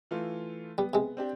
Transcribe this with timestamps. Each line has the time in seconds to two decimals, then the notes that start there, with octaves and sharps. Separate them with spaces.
0.11 E3 A3 F4
0.78 G3 B3
0.93 C3 G#3
1.17 C4 D4 G4